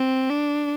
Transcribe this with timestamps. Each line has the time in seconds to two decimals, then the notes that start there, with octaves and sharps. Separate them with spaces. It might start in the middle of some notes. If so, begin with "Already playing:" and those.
Already playing: C4
0.30 D4